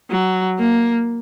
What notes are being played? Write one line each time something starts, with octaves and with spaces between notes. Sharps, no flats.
F#3
A#3